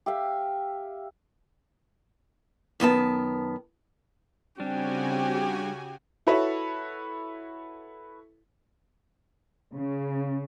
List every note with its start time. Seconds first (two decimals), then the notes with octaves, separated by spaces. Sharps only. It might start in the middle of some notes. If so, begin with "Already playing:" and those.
0.06 G4 E5 F5
2.80 F#2 D#3 B3 A5
4.60 C#3 G3 C4 D4 F#4 G4 G#5
6.27 E4 F#4 A4 B4 C#5 E5
9.74 C#3